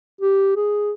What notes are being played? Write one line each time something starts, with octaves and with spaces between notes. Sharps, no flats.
G4
G#4